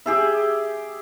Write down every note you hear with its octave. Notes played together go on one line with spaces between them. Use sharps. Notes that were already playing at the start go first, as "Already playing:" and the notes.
G4 G#4 E5